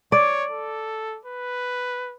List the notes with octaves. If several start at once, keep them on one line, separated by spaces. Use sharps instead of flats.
C#5 D5
A4
B4